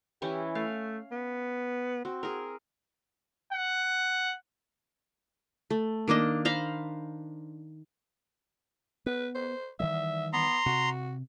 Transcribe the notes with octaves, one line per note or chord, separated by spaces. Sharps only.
E3 C#4 E4 G4
A3 F5
B3
C4 F#4
G#4 A#4
F#5
A3
D#3 A#3 D4 D#5
C5 F5 A#5 B5
B3 B4
C5
D#3 E3 G3 E5
B3 A#5 C6
C3 F#4